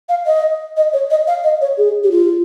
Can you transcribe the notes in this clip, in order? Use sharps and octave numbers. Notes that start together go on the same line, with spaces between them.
F5
D#5
D#5
C#5
D#5
F5
D#5
C#5
G#4
G4
F4